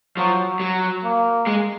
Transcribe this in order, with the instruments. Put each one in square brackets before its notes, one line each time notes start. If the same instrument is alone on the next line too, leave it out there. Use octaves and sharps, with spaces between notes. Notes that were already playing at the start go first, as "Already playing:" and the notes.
[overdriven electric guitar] F3 [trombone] F#3
[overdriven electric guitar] F#3
[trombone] A#3
[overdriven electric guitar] G#3